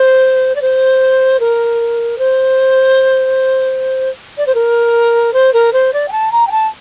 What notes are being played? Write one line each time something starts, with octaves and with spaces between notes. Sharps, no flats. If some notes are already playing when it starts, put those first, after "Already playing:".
Already playing: C5
D5
C5
A#4
C5
D5
C5
A#4
C5
A#4
C5
D5
G5
A5
A#5
G5
A5